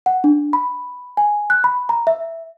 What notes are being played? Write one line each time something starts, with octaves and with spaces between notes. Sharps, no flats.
F#5
D4
B5
G#5
F#6
B5
A#5
E5